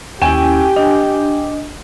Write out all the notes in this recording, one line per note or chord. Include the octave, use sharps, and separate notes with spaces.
D#2 C#4 E4 G4 G5 G#5
D4 D#5